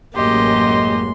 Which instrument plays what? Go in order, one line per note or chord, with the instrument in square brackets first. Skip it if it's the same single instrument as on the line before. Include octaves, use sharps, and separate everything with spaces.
[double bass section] A1 F#2 G#3 [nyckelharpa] A#3 [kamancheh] G4 D#5 [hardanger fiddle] C6